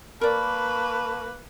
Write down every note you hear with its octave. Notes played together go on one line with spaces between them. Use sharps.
A#3 A#4 B4 D5 A5 B5 C#6